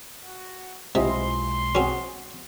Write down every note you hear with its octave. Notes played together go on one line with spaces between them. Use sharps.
F#4
B1 C3 G#3 E4 F4 D#5 C6
C4 C#4 F#4 G#4